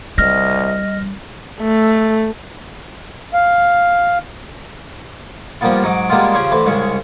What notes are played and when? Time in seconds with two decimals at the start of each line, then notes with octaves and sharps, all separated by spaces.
0.18 C2 G3 D#5 F6 A#6
1.61 A3
3.34 F5
5.61 F3 G3 A#3 B3 F4
5.83 G#2 F#3 D#5 D6
6.10 G3 G#3 A#3 B3 F4
6.34 C#3 F3 G4 G#4
6.51 D2 E3 B4 C5
6.66 C2 C#3 G#3 C#6